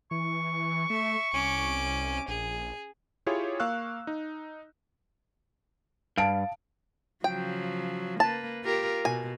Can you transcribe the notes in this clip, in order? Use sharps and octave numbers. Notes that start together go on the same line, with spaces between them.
E3 C#6
A3 E5
C2 C#4 D6
A#1 G#4
E4 F4 G4 G#4 C#5
A#3 F5 C#6 E6 F#6
D#4
G2 F5 A5 D7
C#3 F3 F#3 G5
A#3 B4 A5
F4 G4 A#4
B2 G#5